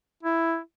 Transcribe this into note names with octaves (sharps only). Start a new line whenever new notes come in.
E4